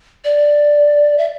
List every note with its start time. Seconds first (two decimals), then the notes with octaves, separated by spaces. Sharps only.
0.24 D5
1.18 E5